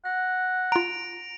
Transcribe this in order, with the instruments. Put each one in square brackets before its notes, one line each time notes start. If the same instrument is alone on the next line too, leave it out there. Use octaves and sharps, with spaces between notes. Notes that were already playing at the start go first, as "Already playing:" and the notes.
[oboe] F#5 [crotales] A#6
[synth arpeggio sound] F4 A#5 [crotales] D7 F7